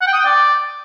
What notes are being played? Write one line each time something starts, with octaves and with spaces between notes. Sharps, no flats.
F#5
G5
D#6
G5
D5